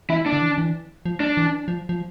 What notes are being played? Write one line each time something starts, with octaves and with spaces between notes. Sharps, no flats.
E3 E4
D4
D3
E3
E3
F3
D4
E3
F3
F3